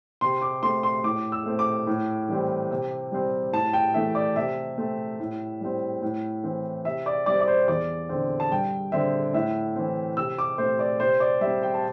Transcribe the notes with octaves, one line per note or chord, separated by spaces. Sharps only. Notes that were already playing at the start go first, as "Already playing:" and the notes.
C3 C6
D6
A3 C4 C6
C6
A2 D6
E6
A3 C4
D6
A2
E3 G3 C4
C3
G3 C4
A2 A5
G5
E3 A3 E5
D5
C3 E5
A3 C4
A2
G3 C4
A2
E3 C4
C3 E5
D5
G3 C4 D5
D5
C5
E2 D5
D3 C4
A5
G2 G5
D3 C4 E5
A2 E5
E3 C4
C3 E6
D6
A3 C4 C5
D5
C3 C5
D5
G3 E5
C4
G5
A5